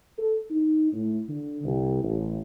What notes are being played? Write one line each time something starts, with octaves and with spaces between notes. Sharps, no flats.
A4
D#4
A2
D3
C2
A1